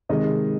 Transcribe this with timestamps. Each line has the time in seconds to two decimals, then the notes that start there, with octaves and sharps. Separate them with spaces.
0.09 C3 D#3 G#3 D#5